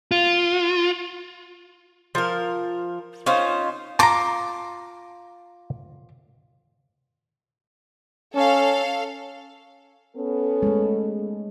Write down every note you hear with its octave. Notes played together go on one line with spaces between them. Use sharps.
F4
F3 A#4
C#4 D#4 F4 C5
F4 A5 A#5 D6
C#4 A4 F5
B3 C#4 A4
G#3 A3